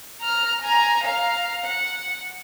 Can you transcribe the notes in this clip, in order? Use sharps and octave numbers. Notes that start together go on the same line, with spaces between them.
A#5 F6
G#5 A#5
F5 A#5
F#5